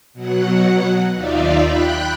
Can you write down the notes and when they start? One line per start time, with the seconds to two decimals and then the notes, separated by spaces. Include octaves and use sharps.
0.13 B2 F#3 F#5
1.14 D#2 D#4 F4 D5 E5 F5
1.64 G5 B5 F#6